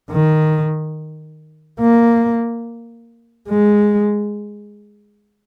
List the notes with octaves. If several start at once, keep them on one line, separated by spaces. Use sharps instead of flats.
D#3
A#3
G#3